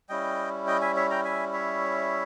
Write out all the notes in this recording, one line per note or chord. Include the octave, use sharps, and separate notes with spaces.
G3 C#4 E4 D#5 G5
D#5 G5
E5 G#5
C#5 E5
G5 A#5
E5 G#5
C#5 E5